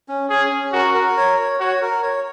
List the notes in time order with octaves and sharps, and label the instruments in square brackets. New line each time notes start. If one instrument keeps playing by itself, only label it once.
[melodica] C#4
[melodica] C#4 [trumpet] G#4
[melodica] C#4
[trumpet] F#4 [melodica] A#4
[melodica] A#4
C#5
C#5
[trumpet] F#4 [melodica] C#5
[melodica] A#4
C#5